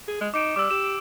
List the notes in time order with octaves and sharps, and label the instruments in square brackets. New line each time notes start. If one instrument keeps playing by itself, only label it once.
[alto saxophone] G#4
G#3
[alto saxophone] D#4 [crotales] D6 D7 E7
[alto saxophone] G3 [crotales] D6 E6
[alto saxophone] G4 [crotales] E7